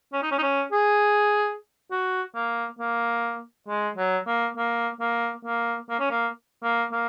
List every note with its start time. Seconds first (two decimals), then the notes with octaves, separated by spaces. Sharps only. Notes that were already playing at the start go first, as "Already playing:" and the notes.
0.13 C#4
0.22 D#4
0.31 C#4
0.38 D#4
0.42 C#4
0.72 G#4
1.91 F#4
2.35 A#3
2.79 A#3
3.68 G#3
3.97 F#3
4.27 A#3
4.57 A#3
5.00 A#3
5.45 A#3
5.90 A#3
6.00 C#4
6.10 A#3
6.63 A#3
6.93 A#3